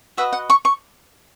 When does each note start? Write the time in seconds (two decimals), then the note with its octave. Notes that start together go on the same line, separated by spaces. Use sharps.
0.17 F#4 B4 D#5 E5
0.33 F#5
0.50 C#6
0.65 C#6